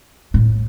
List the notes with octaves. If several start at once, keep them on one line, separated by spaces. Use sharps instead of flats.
A2